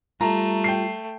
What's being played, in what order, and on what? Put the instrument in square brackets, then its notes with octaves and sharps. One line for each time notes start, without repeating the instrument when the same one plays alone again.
[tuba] G3 [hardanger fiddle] A3 [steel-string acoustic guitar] F4 [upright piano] A#5
[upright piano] G5 C7